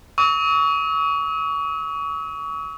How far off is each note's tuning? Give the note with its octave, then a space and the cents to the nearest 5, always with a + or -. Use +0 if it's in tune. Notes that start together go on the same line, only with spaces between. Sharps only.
C#6 +35 E6 -45